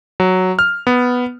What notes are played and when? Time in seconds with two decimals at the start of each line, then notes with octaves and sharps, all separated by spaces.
0.20 F#3
0.59 F6
0.87 B3